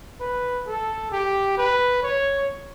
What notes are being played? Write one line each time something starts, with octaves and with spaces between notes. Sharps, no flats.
B4
A4
G4
B4
C#5